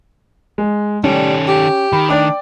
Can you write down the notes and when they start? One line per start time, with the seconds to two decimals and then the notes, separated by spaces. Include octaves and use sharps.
0.58 G#3
1.04 A2 D#3 G3 C#4 A4
1.47 G4
1.93 D#3 B5
2.09 A3 D4 D5 G5 D6